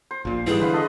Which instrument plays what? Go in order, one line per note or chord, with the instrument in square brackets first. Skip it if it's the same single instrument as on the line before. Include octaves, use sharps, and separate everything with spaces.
[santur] C5
[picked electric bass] A#1 A#2
[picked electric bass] G#2 G3 [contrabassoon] E3 [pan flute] G#4
[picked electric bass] D3 [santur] B4 C5 F5
[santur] A4 D#5 C#6